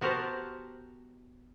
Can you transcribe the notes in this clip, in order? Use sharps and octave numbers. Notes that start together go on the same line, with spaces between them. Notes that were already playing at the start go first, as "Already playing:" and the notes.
B3 F#4 G4 A#4 C5 A5